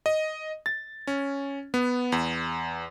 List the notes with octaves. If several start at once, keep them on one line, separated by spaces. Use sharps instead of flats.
D#5
A6
C#4
B3
E2